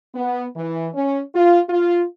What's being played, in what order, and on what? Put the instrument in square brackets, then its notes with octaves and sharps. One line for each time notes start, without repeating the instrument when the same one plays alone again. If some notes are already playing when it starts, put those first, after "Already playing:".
[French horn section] B3
E3
C#4
F4
F4